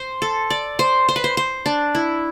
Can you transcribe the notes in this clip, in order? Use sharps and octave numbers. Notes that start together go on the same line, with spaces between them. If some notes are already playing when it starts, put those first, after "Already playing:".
Already playing: C5
A4
D5
C5
C5
B4
C5
C5
D4
E4